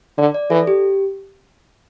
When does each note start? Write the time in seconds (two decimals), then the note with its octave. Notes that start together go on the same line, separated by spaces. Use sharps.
0.18 D3 D5
0.34 D5
0.50 E3 A4
0.67 G4